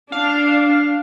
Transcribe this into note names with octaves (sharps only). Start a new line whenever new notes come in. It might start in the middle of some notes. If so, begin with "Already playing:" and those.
D4 F5